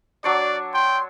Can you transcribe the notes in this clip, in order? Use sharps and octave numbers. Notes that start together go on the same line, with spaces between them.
F#3 D4 C#5 D5
G5 C6